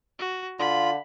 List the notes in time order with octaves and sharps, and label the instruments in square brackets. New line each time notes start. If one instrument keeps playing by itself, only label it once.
[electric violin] F#4
[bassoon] D3 [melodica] F4 [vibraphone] F5 [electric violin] B5